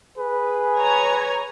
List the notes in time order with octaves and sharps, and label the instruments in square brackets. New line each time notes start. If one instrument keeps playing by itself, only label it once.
[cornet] G#4 [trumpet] B4
[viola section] C#5 G#5 A#5